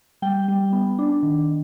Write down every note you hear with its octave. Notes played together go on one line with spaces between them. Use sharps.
G3 G5
G3
B3
D4
D#3